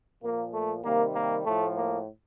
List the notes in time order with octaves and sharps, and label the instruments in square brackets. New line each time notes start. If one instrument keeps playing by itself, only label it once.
[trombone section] A#2 F3 A#3
A3
C3 D#3 G3 A#3
A#3
A2 F3 A3
A#3